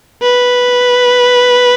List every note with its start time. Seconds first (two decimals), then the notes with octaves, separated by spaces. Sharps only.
0.22 B4